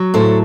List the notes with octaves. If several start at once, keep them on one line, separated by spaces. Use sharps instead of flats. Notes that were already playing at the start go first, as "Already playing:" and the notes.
Already playing: F#3
A2 A4 C5